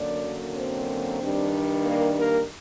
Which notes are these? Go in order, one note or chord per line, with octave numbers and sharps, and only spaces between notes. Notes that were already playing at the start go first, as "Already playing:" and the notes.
Already playing: F#2 D3 F#3 A#3 D4 D5
C4 C5
G2 D#3 G3 D4
A#3 A#4
A#3 A#4